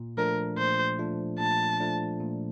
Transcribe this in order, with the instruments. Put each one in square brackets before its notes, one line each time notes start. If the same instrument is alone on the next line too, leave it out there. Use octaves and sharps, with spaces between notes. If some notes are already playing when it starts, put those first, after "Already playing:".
Already playing: [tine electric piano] A#2
[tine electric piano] F3 A3 D4 [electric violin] A#4
[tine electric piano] A#2 [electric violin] C5
[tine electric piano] F3 A3 D4
[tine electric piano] A#2 [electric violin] A5
[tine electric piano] F3 A3 D4
A#2